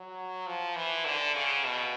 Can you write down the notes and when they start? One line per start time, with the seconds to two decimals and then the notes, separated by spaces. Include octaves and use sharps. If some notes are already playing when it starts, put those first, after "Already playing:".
Already playing: F#3
0.47 F3
0.76 E3
1.05 D3
1.35 C#3
1.65 B2